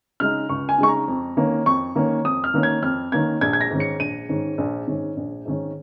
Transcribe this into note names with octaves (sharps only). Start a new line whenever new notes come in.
C#3 G#3 D#4 F6
C#2 C#6
G#5
C#3 G#3 D#4 C#6
A#5
F2
D#3 A#3 C#4
F2 C#6
D#3 A#3 C#4
F2 D#6
F6
D#3 A#3 C#4
G#6
F2 F6
D#3 A#3 C#4 G#6
A#1 G#6
G#6
A#6
G#2 D#3 C#4
C#7
A#1 D#7
G#2 D#3 C#4
A#1
G#2 D#3 C#4
A#1
G#2 D#3 C#4